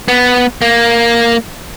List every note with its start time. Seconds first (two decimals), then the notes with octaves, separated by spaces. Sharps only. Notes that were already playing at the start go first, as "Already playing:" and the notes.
0.08 B3
0.62 A#3